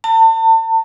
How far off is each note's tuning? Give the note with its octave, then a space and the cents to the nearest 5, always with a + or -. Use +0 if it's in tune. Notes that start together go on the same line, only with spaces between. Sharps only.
A5 +40